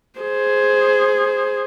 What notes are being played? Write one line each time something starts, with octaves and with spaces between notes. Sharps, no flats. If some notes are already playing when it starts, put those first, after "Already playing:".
G#4 C5